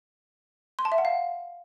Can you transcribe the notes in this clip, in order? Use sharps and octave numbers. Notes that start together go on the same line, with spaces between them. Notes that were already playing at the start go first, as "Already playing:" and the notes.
C6
A5
E5
F#5
F5